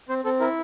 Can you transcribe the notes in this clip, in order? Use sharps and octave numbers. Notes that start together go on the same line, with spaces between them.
C4 C5
C4 A4
E4 A#4